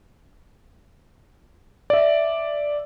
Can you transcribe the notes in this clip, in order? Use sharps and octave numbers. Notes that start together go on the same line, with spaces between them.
D5 E5